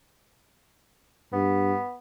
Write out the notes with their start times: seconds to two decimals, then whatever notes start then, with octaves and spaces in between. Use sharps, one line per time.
1.33 G2 B3